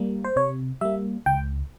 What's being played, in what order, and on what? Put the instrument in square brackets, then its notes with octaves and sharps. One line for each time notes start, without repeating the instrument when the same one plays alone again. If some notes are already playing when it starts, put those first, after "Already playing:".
Already playing: [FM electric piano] G3 A#3
C5
C3 C#5
G3 A#3 E5
C#2 G5